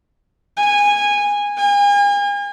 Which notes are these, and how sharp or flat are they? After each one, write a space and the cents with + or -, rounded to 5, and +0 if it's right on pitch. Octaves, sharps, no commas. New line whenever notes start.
G#5 -15
G#5 -40